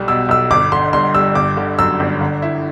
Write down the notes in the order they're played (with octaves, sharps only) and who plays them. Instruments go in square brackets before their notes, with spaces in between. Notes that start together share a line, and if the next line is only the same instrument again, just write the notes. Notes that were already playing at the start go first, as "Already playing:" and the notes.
Already playing: [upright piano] B1 G3
[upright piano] B2 [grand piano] E6
[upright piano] B1 [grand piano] E6
[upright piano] G1 [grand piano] D6
[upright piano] D3 [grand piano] C6
[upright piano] G2 [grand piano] C6
[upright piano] G3 [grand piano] E6
[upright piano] G1 [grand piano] D6
[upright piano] D3
[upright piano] F#2 [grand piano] E6
[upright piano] G1
D3
E4